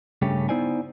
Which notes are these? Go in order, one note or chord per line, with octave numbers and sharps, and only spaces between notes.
G2 C#3 A3 C#4 G4
B3 D#4 E4 C5 D5 G#5